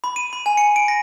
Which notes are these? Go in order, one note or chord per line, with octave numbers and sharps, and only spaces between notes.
B5
D#7
B5
G#5
C#7
D7
A#6